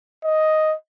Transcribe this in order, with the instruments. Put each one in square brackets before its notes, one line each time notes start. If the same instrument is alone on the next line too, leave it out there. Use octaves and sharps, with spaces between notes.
[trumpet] D#5